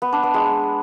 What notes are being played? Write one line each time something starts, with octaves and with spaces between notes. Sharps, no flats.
B3
D4
B3
G#3